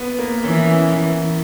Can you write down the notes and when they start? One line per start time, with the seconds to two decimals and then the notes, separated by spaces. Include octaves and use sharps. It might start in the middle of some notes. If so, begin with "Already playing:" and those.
Already playing: B3
0.19 A#3
0.43 E3 C#4